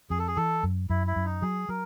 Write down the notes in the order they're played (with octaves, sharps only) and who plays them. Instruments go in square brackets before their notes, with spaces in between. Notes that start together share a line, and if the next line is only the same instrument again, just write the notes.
[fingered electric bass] F2 [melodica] G#4
[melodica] A4
G#4
[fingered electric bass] E3 [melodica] A4
[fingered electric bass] F#2
[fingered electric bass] F#2 [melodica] E4
[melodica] E4
[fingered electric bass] F#2
[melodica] D#4
[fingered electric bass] F#3 [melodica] G#4
[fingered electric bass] F#3 [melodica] A#4